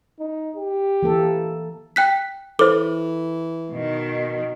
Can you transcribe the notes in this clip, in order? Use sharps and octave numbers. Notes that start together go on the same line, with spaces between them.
D#4
G4
E3 A#3 A4
G5 F#6 B6
E3 A4 C5 D6
B2 D#3